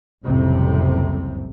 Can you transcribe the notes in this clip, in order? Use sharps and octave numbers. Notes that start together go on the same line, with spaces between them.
F#1 C2 F2 A2 C3